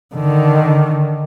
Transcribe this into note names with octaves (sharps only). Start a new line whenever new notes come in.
D3 D#3